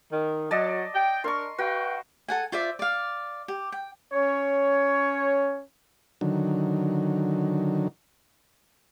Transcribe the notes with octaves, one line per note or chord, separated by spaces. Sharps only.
D#3
F#3 D5 D#5 A5
G5
D4 A#4 C6 C#6
F#4 B4 F5 G5
A4 F#5 G#5
F4 C5 D5 E5
D5 F5
G4
G5
C#4 C#5
D3 D#3 F#3